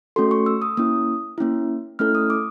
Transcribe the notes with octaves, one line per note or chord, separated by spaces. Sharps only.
A3 C#4 F#4 A4 C6
C#6
E6
D#6
A#3 C#4 E4 D#6
A#3 C#4 E4
A3 C#4 E4 A4 F6
D#6
D6